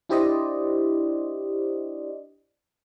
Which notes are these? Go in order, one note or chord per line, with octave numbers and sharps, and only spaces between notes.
D4 E4 G4 C5 D5 D#5